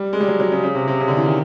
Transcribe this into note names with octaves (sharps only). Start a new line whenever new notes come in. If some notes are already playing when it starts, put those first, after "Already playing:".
Already playing: G3
G#3
G3
F#3
F#3
C#3
C#3
C3
C3
C#3
D3
E3
D#3